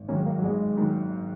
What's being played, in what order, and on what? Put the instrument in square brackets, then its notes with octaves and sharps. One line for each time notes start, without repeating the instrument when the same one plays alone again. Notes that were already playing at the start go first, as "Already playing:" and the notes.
Already playing: [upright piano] G#1
[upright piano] G#2 D#3 F#3 A#3 [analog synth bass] C#4
[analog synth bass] A#3
F#3
[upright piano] G#1 [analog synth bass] G#3
[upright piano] G#2 D#3 F#3 A#3